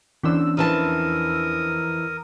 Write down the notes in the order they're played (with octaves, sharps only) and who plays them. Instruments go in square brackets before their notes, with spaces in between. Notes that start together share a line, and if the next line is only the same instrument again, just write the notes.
[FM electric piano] E2 E6 [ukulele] C#4 D4 C5
[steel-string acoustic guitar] F2 E3 A5 [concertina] A#4 D#6